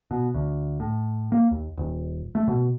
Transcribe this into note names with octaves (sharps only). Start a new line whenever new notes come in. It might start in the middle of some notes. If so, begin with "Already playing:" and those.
B2
D2
A2
A#3
D#2
D#1
A3
B2